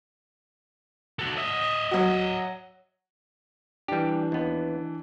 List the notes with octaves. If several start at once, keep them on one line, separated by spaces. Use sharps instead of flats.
F#4 A4
D#5 E5
F#3 F#4
E3 G3 D4 G4
D#2 B3